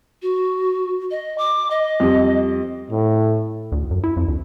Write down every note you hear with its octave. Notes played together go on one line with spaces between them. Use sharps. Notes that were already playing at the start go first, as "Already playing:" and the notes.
F#4
D#5
D6
D#5
F2 G3
A2
D2
F#2
E4
F2
D2